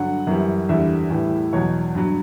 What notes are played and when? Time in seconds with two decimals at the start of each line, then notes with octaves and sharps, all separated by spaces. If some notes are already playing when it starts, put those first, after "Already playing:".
Already playing: G2 D3 F#3 F#5
0.27 F#2 E3 G3
0.69 E2 D3 G3 E5
1.10 A2 E3 G3
1.53 E2 B2 F#3 C#5
1.95 G2 F#3